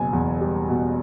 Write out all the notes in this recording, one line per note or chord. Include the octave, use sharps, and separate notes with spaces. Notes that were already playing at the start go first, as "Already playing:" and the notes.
Already playing: F#1 B2 G#5
E2
G3
B2